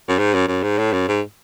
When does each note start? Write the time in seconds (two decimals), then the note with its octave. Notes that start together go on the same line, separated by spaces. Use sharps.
0.08 F#2
0.19 G#2
0.34 F#2
0.48 F#2
0.63 G#2
0.79 A2
0.93 F#2
1.08 G#2